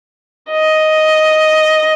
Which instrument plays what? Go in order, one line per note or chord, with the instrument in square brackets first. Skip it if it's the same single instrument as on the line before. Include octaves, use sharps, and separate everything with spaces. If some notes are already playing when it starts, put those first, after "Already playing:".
[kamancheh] D#5